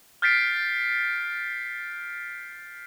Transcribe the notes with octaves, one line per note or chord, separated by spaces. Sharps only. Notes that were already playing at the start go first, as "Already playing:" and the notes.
F6 G6 A6 B6 C7 D7